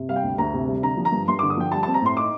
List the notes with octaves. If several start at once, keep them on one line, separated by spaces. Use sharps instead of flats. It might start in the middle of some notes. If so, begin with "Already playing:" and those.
Already playing: C3
G3 F5
G5
D2
D2 A#5
C3
G3
D3 A#5
F3
A#5
G2
G2 C6
D6
D3
D#6
F3 G5
G3 A5
A5
C4
A#5
A2 C6
D#4 D6